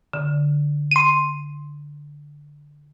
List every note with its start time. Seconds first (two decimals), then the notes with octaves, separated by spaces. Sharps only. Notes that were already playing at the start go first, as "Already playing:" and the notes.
0.13 D3
0.91 C6 D#7